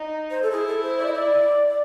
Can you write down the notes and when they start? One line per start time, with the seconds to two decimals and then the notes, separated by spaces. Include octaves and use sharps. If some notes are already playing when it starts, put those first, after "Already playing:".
Already playing: D#4
0.31 C5
0.43 A4
0.51 E4 G#4
0.67 A4
0.83 C5
0.99 D5
1.06 D#5
1.14 D5